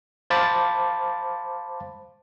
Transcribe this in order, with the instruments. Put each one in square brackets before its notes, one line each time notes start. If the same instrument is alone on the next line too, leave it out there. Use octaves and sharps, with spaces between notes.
[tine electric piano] C5 F5 A5 B5 D6 A6